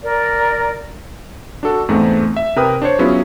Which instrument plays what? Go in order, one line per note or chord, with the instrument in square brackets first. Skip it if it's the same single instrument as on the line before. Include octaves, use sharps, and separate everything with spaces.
[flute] A#4 [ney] D5
[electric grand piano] D4 F#4 A4
E2 G#2 A3 C4
E5
C3 A#4 B4 G5 D#6
D4 C5 C#5
F#3 B3 C#4 E4 F4 G#4